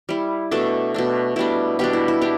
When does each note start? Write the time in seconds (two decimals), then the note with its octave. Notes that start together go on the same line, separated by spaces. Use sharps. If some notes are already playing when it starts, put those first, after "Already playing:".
0.09 G3 E4
0.51 B2 A3 D4 A4
0.94 B2 A3 D4
1.36 B2 G3 D4 E4
1.79 B2 G3 D4 G4
1.93 E4
2.08 E4
2.22 D4 G4